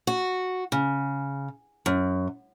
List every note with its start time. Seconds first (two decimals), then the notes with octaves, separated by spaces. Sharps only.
0.07 F#4
0.72 C#3
1.86 F#2